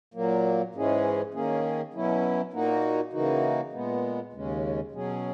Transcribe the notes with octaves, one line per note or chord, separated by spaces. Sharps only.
A#2 F#3 A#3
G#2 E3 G#3 C#4 G#4
D#3 A#3 C#4 G#4
B2 F#3 C#4 E4
A#2 A#3 D#4 F#4
C#3 E3 A#3 D#4 F#4
A#2 G#3 B3
D#2 C#3 G#3 C#4
B2 F#3 C#4 G#4